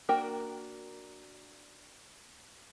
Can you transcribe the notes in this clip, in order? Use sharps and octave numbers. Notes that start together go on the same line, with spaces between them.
A#3 D4 F#4 A#4 G5